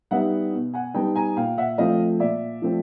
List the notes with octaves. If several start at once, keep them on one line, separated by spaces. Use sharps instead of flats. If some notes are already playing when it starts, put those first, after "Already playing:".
G3 B3 D#4 E5 F#5
B2
F#5 G#5
G3 B3 D#4 G5 A5
G#5 A#5
A#2 F5 G5
E5 F#5
F3 A3 C4 D#5 F5
A#2 D5 E5
F3 A3 C4